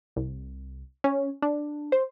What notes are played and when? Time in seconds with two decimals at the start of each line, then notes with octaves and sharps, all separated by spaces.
0.16 C2
1.04 C#4
1.42 D4
1.92 C5